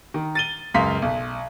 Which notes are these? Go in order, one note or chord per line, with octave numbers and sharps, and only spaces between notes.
D#3
A6 D#7 G7
C#2 F#2 F5 C6 B6
B1